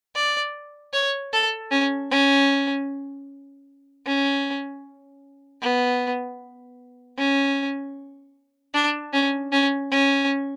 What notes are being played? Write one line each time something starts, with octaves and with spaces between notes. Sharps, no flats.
D5
C#5
A4
C#4
C#4
C#4
B3
C#4
D4
C#4
C#4
C#4